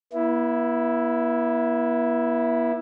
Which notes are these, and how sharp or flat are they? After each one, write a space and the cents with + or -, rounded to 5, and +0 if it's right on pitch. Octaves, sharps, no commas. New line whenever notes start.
B3 -40 E4 +0